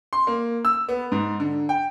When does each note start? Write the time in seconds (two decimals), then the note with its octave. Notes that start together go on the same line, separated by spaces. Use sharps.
0.13 C6
0.27 A#3
0.65 E6
0.89 B3
1.12 G#2
1.40 D3
1.69 G5